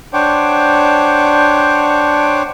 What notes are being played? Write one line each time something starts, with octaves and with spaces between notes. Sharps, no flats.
D4 C5 C#5 F#5 G5 D6